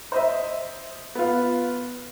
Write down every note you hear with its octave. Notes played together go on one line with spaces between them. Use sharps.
C5 D#5 E5
B3 F4